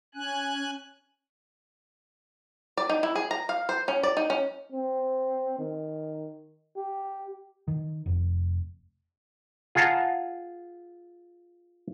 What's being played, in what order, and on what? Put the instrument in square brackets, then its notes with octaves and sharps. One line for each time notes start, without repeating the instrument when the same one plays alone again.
[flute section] C#4 [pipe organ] G#5 F#6
[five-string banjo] D5
D#4
E4
G#4
A#5
F5
C5
C#4
D5
D#4
C#4
[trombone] C4
D#3
G4
[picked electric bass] D#3
F1
[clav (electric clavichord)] F4 G#4 F#5 A5 A#5